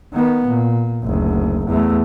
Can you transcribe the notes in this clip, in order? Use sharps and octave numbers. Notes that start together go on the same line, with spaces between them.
D#3 B3
A#2
F#1 D2
E2 A3